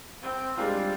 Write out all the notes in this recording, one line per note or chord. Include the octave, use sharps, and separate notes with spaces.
C4
G3 G#3 D4 F4